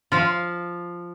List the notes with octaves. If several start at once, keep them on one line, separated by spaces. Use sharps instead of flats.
F3 F4